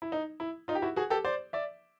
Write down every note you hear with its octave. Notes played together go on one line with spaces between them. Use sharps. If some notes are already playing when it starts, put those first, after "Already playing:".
E4
D#4
E4
D#4 F4
G4
E4 F#4
F#4 G#4
G4 A4
C5 D5
D5 E5